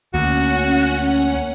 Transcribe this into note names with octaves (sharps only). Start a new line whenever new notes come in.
D2 A#3 C#4 F#4 F#5